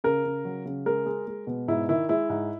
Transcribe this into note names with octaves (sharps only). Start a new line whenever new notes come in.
C#3 A#4
C#3
F#3
C#3
G#3 A#4
G#3
G#3
B2
G#2 E4
D#3 E4
G#3 E4
G#2